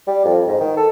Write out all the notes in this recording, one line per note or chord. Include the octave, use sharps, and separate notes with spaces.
G3
F2
G#2
D#3
A4